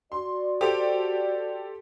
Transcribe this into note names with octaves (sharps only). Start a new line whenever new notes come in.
F#4 D5 C6
G4 A4 C5